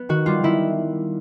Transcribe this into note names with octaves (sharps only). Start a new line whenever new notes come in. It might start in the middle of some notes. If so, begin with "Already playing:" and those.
Already playing: B3
D#3 F#4
G3 F4
D#3 E4